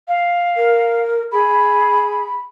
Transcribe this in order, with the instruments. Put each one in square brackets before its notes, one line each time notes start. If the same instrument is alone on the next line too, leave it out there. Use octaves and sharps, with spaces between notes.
[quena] F5
[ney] A#4
[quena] G#4 [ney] B5